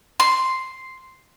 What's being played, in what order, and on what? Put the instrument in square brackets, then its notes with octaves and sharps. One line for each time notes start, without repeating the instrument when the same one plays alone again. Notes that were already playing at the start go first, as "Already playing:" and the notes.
[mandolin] C6